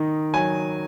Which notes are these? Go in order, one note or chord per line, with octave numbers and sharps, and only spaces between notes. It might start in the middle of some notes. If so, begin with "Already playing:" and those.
Already playing: D#3 D#4
F#3 G#5